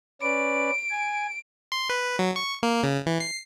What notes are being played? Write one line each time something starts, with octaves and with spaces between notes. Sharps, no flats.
C#4 B4 D5 D7
G#5
C6
B4
F#3
C#6
A#3
C#3
E3
C7